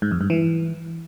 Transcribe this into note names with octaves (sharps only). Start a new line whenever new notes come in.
G#2
F2
G2
E3